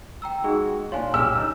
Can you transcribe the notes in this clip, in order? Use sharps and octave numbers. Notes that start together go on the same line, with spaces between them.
G5 A#5 E6
G#3 D#4 F#4 G#4
A#2 D4 F4 C#5 F5 G#5
B1 C#3 G4 G#5 E6 F6
D#4